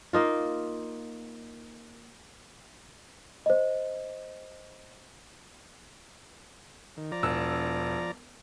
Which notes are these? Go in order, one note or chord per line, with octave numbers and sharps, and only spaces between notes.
A#3 D#4 F4
C5 D#5
D#3
F3 D5 A#5
E1 E6